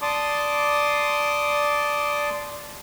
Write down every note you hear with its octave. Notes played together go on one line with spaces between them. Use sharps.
D5 A5 C6 D6 D#6